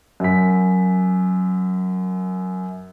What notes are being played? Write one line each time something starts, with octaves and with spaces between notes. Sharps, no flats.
F#2 B6